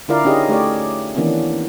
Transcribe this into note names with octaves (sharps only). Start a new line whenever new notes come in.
D3 E4 F4 A#4 D5 F5
C#4 D#4 G4 G#4 D#5
A3 G4 C#5 D5
D#3 E3 A#3 B3 C#4 D4